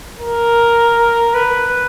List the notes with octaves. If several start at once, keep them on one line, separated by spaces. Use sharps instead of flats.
A#4
B4